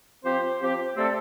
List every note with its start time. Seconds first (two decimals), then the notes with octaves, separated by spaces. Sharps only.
0.23 F3 C4 G4 C5
0.59 F3 C4 G4 C5
0.94 C3 A3 C4 A4 D5